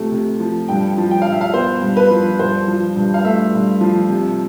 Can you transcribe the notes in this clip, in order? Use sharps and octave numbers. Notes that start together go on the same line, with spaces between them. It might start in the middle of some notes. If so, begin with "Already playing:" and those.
Already playing: C3 F3 A3
C3
F3
G2 G5
F3
G5
G2 F5
E5
F5
B3 C5
G2
B4
F3
G2 C5
F3
G2
F5
A3 E5
G2
F3
C3